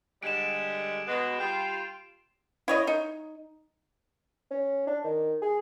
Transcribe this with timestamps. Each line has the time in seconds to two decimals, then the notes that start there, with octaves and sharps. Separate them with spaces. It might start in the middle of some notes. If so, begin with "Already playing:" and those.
0.23 D3 G3 G#3 D7 E7
1.07 B2 G#3 B3
1.39 G3 F4 G5
2.68 E4 C#5 D#5
2.87 D#4
4.51 C#4
4.87 D4
5.04 D#3
5.42 G#4